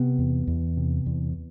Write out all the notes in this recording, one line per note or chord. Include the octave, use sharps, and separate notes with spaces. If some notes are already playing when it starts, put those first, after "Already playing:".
Already playing: C3 B3
E2
E2
C3
E2